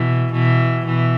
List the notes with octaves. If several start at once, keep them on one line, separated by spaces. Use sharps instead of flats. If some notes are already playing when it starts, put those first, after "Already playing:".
Already playing: B2 E3
B2 E3
B2 E3